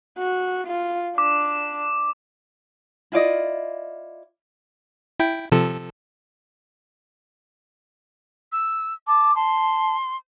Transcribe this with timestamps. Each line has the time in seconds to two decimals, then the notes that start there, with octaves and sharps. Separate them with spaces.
0.18 F#4
0.67 F4
1.18 D4 D6
3.12 E4 F4 D5 D#5
5.20 E4 G5
5.52 C3 F3 A4
8.52 E6
9.07 A5 D6
9.35 A5 C6